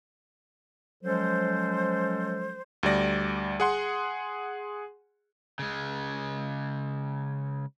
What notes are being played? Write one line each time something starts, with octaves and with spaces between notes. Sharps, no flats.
F3 F#3 G#3 C#4 A4 C5
D2 G3 D5 A#6
G#4 F#5 C6
C#3 G#3